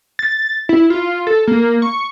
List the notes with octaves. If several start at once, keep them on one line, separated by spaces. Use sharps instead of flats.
A6
E4
F4
A4
A#3
C#6